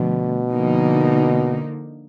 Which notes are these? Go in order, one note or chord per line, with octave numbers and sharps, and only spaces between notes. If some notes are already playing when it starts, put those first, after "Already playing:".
Already playing: B2 D3 F3 A3
D3 F3 A#3 D#4